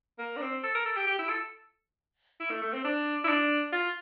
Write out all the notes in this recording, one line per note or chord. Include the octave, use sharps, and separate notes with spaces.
A#3
D4
C4
A4
A#4
A4
G4
G4
E4
A4
E4
A3
A3
C4
D4
E4
D4
F4